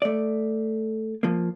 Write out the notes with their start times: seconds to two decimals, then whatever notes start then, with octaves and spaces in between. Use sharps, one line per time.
0.02 A3 D5
1.23 F3 A#3